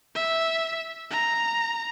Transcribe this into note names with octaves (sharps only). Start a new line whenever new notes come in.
E5
A#5